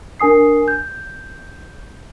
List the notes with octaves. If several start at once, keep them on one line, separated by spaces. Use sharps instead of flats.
D4 A#4 G#5 D#6 C7
G6